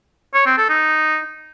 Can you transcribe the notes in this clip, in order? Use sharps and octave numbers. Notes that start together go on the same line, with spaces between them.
C#5
C4
A4
D#4